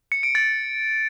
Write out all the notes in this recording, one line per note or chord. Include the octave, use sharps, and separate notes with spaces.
C#7
D7
A6